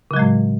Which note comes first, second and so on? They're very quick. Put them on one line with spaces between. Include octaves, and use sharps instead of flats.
C#3 F#3 G#3 A2